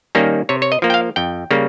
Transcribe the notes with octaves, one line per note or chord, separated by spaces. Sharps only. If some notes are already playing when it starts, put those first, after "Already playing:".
D#3 G3 A#3 C#4
C3 C#5
C#5
D#5
F3 A#3
G5
F5
F2 G5
C#3 G3 A#3